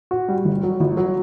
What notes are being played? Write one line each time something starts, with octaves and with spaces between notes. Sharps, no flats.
F#4
G3
G1
F#3
G1
F#3